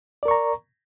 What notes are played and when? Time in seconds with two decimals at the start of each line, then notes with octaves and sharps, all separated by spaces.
0.23 D5
0.25 A#4
0.28 C#6
0.31 A#5